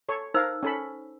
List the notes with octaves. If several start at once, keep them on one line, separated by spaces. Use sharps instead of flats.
A4 C#5
D#4 A#4 C5 F5 E6
C#4 A4 B5